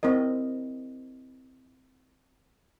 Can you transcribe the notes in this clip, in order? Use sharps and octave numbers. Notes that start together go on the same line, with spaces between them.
C4 E4 A#4 D#5